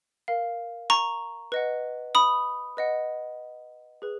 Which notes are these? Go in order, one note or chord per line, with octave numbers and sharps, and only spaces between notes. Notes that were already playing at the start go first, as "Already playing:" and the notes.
A#4 F5
A#5 C#6
B4 D#5 F#5
B5 D#6
B4 D#5 F#5
G#4 B4